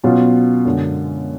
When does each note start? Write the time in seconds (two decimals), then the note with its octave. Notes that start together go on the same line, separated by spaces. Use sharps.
0.04 B2 F#3 C#4 F4
0.65 F#2 D3 G#3 D4